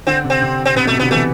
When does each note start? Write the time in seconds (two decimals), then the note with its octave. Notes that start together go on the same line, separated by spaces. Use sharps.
0.07 D3 C4
0.24 C3
0.30 C4
0.42 C3
0.65 C4
0.76 C3 B3
0.85 B2 A3
0.93 C3
0.99 D3 B3
1.11 E3 A3